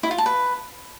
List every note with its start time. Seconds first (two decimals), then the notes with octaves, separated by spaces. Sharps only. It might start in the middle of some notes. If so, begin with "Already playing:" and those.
0.03 E4
0.11 F4
0.18 A5
0.26 B4